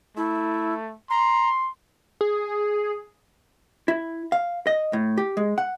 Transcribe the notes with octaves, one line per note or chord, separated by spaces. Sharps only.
A3 E4
A#5 C6
G#4
E4
F5
D#5
A2
G4
G#3
F#5